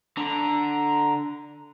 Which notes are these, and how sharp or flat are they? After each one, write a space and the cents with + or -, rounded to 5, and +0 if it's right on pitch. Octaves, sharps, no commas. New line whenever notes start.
D3 +0 A#5 +0